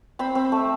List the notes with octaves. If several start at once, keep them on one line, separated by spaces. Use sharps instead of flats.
C4 B5
C4
A3